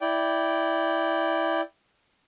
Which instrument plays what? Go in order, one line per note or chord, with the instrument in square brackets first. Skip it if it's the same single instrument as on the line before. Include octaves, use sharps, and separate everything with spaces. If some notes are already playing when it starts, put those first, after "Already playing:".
[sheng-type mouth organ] E4 D5 G5